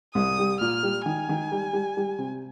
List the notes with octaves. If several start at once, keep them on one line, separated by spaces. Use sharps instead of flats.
C2 D#6
G3
A#2 F6
G3
D#3 G#5
D#3
G3
G3
G3
C3